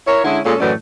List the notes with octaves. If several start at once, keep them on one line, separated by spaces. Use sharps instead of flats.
E4 A#4 C#5
D3 G#3 C#4 E4
A#2 G#3 C#4 A4
F#2 A2 E3 A3 D5